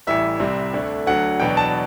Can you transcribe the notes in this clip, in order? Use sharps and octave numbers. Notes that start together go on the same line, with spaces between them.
A1 A2 E3 G3 E5
C2 C3 G3 C4
D2 D3 A3 D4
D2 D3 F#3 F#5
E2 B2 F#3 B3 D4 G5
A5